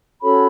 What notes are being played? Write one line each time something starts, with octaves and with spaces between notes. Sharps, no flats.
C#4 F#4 A4 C#5 B5